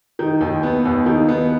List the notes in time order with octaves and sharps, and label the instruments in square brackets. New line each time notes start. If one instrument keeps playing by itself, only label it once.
[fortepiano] D#3
D#2
B3
D#2
D#3
B3